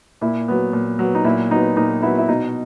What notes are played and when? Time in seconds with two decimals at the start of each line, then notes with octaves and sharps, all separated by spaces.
0.21 A#2 E4
0.48 F#3 B3
0.73 A#2
0.99 F#3 B3
1.15 D#4
1.24 A#2 E4
1.51 F#3 B3 D#4
1.76 A#2 D#4
2.02 F#3 B3 E4
2.18 E4
2.29 B2 D#4